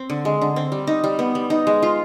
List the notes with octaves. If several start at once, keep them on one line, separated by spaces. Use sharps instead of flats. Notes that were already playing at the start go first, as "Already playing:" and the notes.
Already playing: C4
D3
G#3
D3
C4
G3
D#4
G3
B3
G3
D#4
G#3
F4